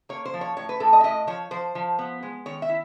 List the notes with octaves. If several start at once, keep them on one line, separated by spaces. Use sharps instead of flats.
A#3 C#5
C5
F3
C#5
A2 C#5
B4
A2 A4
D#5
E5
A2 D#5
F3 C#5
F3 C5
F3
B3
G#3
D#3 C#5
E5
E4